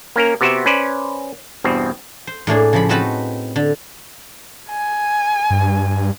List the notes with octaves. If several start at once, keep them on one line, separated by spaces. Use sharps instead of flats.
A#3 C#4 A#4
C3 B3 F#4 G4 C5 E5
C#4 B4 C5 D5
E2 G2 B2 C4
C5
A2 A#3 D4 G#4
C#3 F3 B5
C4 D#4 F#4 B4 A5 B5
D3
G#5
G2